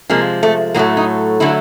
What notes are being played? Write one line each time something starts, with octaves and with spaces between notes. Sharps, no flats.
C3 F3 G#3 A#3
A3
A2 F#3 A3 A#3
D#4
D3 F#3 A3 E4